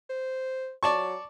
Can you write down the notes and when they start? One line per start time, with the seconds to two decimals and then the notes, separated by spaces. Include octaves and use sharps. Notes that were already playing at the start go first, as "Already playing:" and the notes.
0.09 C5
0.83 F#3 D5 A5 C#6